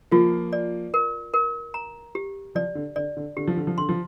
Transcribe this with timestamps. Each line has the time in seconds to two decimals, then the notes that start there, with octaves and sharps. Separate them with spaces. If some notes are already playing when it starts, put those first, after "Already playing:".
0.12 F3 A#3 F4
0.53 D5
0.94 A#4
1.34 A#4
1.74 A#5
2.15 G4
2.55 F3 D5
2.75 D3
2.96 D3 D5
3.17 D3
3.37 D3 G4
3.47 F3
3.57 D3
3.67 F3
3.78 D3 C6
3.89 F3